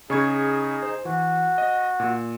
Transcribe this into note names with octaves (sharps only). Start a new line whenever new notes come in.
C#3 D#4 G#4 C#6 G#6
C5
E3 F#4
D#5
A#2